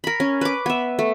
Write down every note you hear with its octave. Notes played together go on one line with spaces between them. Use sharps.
A#4 B5
C#4
B4 D6
B3 E5
A3